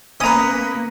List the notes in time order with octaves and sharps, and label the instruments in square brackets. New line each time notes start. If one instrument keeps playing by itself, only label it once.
[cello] A#3 B3 [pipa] C#4 A#5 [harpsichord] B4 D#6